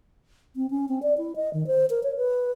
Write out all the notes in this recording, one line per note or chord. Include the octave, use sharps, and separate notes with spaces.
C4
C#4
C4
D5
E4
D#5
D#3
C5
A#4
C#5
B4